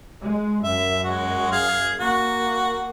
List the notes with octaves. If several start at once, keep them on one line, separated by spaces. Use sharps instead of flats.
G#3
F#2 E5
G#3 F#4
G#4 F5
A#3 F#4